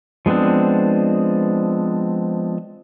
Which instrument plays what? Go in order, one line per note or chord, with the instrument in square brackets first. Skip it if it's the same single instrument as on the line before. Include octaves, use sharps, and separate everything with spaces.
[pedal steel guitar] F3 G#3 B3 C4 D4